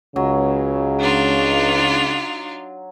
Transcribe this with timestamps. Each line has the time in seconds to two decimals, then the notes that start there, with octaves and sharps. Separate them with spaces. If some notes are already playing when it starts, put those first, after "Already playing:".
0.16 C#2 C#3 F#3
0.98 D4 D#4 F4